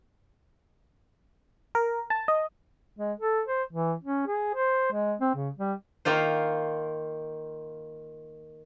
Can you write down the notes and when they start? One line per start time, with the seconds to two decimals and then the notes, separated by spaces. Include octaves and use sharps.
1.75 A#4
2.10 A5
2.28 D#5
2.99 G#3
3.20 A4
3.47 C5
3.73 E3
4.03 C#4
4.27 G#4
4.54 C5
4.92 G#3
5.21 C4
5.35 C#3
5.57 G3
6.05 D#3 A#3 F4 C5